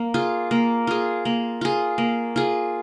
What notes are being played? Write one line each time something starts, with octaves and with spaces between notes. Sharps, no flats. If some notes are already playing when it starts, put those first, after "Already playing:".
Already playing: A#3
F4 G#4
A#3
F4 G#4
A#3
F4 G#4
A#3
F4 G#4